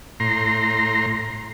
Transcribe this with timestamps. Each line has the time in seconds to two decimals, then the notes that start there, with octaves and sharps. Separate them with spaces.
0.20 A2 A#5 C6